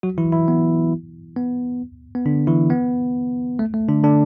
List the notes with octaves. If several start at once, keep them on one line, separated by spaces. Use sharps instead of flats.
F#3 F#4
E3 E4
E3 E4
B3
B3
B3
D3 D4
E3 E4
B3
A3
A3
D3 D4
D3 D4